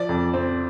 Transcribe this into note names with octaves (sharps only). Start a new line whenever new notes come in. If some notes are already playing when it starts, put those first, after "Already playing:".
Already playing: F3 D5
F2
C4